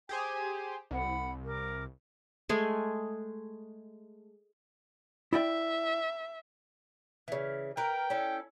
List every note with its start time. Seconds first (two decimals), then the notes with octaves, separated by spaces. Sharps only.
0.09 G4 G#4 C5 G#5
0.91 C2 F#5 B5
1.46 A#4 D6
2.49 G#3 A3 G#4
5.33 E4 D5 E5 G5
7.28 C#3 E3
7.77 A#4 B4 G5
8.10 C#4 E4 A4